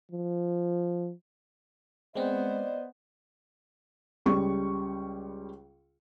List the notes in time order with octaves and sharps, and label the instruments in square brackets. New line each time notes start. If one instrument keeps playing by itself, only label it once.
[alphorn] F3
[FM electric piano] G#3 C4 [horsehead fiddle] B3 C5 [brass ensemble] D5 D#5
[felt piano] C#2 G3 C#6